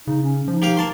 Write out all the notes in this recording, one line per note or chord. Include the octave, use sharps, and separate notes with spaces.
C#3 D#4
C#4
F3 D#4
A#3 G4 F5
A#3 A5 C6